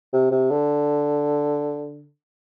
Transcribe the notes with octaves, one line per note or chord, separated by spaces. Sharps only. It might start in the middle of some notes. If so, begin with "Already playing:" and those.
C3
C3
D3